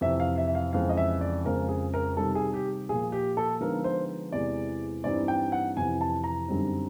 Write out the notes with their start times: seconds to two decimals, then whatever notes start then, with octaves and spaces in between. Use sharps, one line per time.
0.01 F2 C3 E3 E5
0.20 F5
0.38 E5
0.48 E5
0.55 F5
0.73 F2 C#3 E3 G#3 F5
0.89 D#5
0.97 E5
1.21 D5
1.45 F2 C#3 F3 G#3 A#4
1.69 G#4
1.94 A#4
2.17 C3 D#3 G3 A4
2.35 G#4
2.54 G4
2.89 A#2 F3 A#3 G#4
3.12 G4
3.37 A4
3.61 D3 F3 G#3 B3 D#4 A#4
3.84 C5
4.32 E2 C3 E3 G#3 D5
5.04 G2 E3 G3 C4 D#4 D5
5.28 G5
5.52 F#5
5.77 F2 C3 E3 G#5
6.01 A5
6.24 A#5
6.48 F#2 D3 G3 C4 D#4